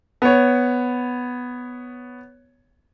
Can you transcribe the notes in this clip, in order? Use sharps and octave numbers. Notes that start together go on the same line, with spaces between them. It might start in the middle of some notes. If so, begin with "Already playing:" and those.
B3 C#5